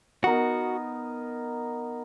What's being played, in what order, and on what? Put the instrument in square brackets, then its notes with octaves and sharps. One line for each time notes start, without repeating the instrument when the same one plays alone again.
[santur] B3 D#4 A#4 [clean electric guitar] F#4